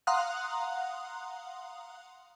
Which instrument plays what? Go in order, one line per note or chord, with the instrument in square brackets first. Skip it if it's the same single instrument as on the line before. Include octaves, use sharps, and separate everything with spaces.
[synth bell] F5 F#5 A#5 C6 D#6 F#6